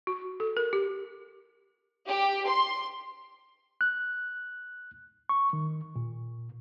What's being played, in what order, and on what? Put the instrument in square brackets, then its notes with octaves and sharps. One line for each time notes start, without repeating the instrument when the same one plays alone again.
[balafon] F#4
A4
A#4
G4
[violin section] G4
C6
[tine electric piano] F#6
C#6
D#3
A#2